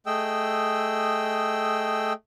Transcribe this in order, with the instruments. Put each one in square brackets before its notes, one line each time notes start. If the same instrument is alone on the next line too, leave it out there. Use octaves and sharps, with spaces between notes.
[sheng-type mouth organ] A3 G#4 D#5 G5 E6